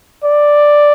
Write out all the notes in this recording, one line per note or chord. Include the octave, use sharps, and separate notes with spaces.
D5